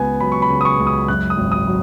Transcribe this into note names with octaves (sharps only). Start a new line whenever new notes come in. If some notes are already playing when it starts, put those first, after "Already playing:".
Already playing: C#2 C#3 B3 G#5
F#3 B5
C#6
B5
C#3
D#6
C#6
C#2
D#6
F#2 F#6
D#6
G#1
D#6
F#3